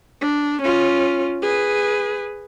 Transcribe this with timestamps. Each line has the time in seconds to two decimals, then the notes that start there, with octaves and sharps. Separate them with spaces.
0.22 D4
0.62 C#4 F4
1.42 G#4 B4